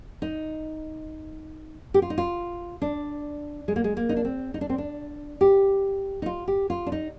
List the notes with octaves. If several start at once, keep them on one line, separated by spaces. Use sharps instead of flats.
D#4
G4
F4
D#4
F4
D4
G#3
A#3
G#3
A#3
D#4
D4
C4
D#4
D4
C4
D4
G4
D#4
F4
G4
F4
D4
D#4